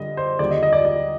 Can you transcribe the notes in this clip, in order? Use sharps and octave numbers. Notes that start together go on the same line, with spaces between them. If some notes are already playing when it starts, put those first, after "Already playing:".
Already playing: G2 D3 G3 D#5
C5
D#2 D3 G3 D5
D#5
D#5
D5
D5